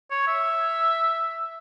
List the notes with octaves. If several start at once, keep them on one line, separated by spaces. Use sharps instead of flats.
C#5
E5